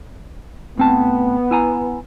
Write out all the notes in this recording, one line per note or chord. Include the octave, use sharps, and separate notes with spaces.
A2 B3 C4 A5
E4 G#5 A#5